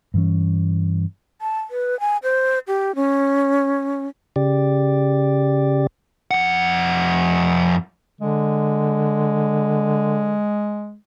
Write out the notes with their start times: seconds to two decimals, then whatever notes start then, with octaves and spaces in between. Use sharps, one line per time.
0.14 G2 E3 C#4
1.41 A5
1.71 B4
2.00 G#5
2.23 C5
2.67 G4
2.96 C#4
4.36 C#3 G4 D5
6.31 F2 F#5
8.21 D3 G#3